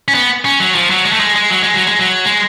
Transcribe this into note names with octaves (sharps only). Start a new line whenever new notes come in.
C#4
B3
C#4
F#3
F3
F#3
G#3
A3
G#3
G#3
F#3
G#3
F#3
G#3
F#3
G#3